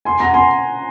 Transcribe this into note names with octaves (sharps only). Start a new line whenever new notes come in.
G#5 C6
F#5 A#5
G#5 C6